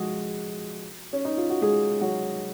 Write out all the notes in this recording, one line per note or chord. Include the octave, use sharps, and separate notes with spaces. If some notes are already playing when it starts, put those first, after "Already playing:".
Already playing: F3 G#3 F#4 G#4
C#4
D#4
F4
F#4
G#3 G#4
F#3 F#4